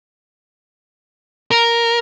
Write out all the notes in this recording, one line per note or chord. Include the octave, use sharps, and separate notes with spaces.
A#4